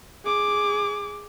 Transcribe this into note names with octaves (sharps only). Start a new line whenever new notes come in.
G#4 D6